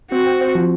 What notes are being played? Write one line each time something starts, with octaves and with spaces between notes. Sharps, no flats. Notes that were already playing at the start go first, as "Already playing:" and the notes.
C4 F#4
C4
C4
F3